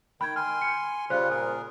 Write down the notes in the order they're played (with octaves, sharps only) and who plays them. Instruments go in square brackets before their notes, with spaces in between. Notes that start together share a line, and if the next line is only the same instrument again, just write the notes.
[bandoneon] D#3 G5 [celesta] B5 G#6
[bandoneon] G#5 C6 [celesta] F6
[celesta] C#7
[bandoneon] C#3 G3 F4 [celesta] C5 F#6
[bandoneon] A#2 G#4 A#4